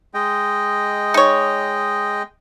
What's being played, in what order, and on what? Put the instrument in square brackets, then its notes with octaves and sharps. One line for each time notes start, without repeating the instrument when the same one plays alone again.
[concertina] G#3 D#5 G5
[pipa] D#4 C#5